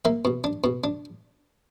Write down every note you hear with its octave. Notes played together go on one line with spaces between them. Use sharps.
A#3 E5
B2
D4
B2
D4